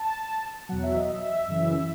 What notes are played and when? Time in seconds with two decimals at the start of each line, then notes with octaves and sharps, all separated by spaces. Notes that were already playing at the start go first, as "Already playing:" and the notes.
Already playing: A5
0.69 E2 B2 F#3 F#5
0.83 E5
0.97 D#5
1.10 E5
1.48 F#2 C#3 E3